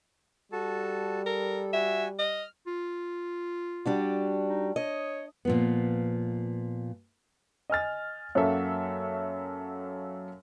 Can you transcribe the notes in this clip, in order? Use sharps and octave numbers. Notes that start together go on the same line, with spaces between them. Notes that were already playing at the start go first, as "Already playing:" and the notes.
G3 F#4 A4 A5
A4 A#4
F#4 E5 G#5
D#5 F6
F4
G3 D4 F#4
D#4
C#5 D#5
A#2 F3 B3
D#5 G#5 F6 A6
F#2 F#3 A#3 A4 E5